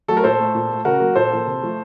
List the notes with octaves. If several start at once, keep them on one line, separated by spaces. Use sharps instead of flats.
F#3 A3 A4
A#4
A#2 A4 C5
A3
A#2
A3
C#3 F#4 A#4
F#3 A#3
A#2 A4 C5
F3 A#3
C3
F3 A3